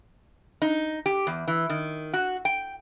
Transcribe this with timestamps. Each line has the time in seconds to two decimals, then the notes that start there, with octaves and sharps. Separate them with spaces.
0.62 D#4
1.06 G4
1.27 E2
1.48 E3
1.70 D#3
2.14 F#4
2.45 G5